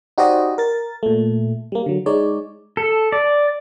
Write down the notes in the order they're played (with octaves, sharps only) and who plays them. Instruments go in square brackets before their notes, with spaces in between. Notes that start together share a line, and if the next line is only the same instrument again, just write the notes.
[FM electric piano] D#4 F#4 G4 C5 D5 D#5
A#4 A6
A#2 A3
G3 A#3
D3 F#3
G#3 D#4 C#5 D5
[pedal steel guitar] A4
D5